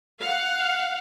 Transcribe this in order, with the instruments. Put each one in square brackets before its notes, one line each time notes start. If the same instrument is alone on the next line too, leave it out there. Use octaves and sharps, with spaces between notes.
[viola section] F5 F#5